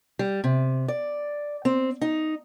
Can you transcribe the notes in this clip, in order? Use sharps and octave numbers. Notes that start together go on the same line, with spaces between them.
G3
C3
D5
C4
D#4